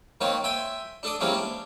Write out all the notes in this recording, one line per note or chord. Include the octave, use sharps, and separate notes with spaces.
D#3 A#3 C4 C#5
E5 G5 G#5 C6
D4 A4 D5 D#6
E3 G3 G#3 A#3 C4 C#4
D4